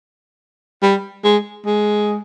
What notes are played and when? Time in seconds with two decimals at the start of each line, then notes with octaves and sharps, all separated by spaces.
0.82 G3
1.24 G#3
1.66 G#3